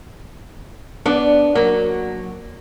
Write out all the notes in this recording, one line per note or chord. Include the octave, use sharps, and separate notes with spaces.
B3 D4
F#3 A#3